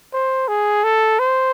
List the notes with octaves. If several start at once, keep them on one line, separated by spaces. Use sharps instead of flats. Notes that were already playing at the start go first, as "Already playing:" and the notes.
C5
G#4
A4
C5